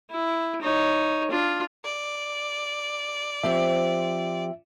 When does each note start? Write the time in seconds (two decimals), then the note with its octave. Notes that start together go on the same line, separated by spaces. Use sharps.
0.11 E4
0.62 D#4 C#5
1.31 D4 F4
1.85 D5
3.43 F3 C4 G4 E5